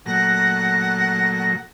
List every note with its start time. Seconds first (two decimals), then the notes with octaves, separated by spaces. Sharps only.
0.06 A#2 F#3 A3 F#5 A#6